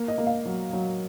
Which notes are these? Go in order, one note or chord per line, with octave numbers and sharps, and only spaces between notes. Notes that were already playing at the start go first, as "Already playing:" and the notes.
Already playing: A#3
D#5
A#3
F5
F#3
F#3